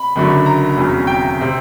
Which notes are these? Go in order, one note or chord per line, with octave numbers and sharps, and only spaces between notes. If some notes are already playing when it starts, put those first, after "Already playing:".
Already playing: B5
F#1 F#2 D3 F#3
A#5
F1 E2 C#3 F#3
G5
C3